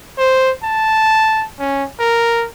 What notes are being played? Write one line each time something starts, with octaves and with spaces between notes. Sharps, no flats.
C5
A5
C#4
A#4